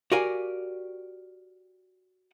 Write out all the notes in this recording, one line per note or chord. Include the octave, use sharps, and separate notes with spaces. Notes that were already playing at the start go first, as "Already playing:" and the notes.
F#4 G4 A#4 D5 F5 G#5